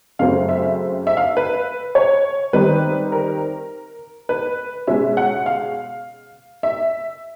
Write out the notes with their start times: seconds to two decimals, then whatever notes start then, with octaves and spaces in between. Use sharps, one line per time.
0.19 F#2 C#3 F#3 A3 C4 F5
0.49 E5
1.07 E5
1.17 F5
1.37 B4
1.95 C#5
2.53 D#3 G3 C4 D#4 B4
3.12 A#4
4.29 B4
4.87 B2 G#3 C#4 E5
5.17 F#5
5.46 F5
6.63 E5